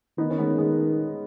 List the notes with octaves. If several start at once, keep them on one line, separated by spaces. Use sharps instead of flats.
D#3 B3 D#4
C#4
G#3 B3
G#3 B3